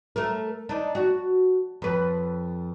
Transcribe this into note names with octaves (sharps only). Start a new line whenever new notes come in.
A3 A#4
D4 D#4
F#4
F2 B4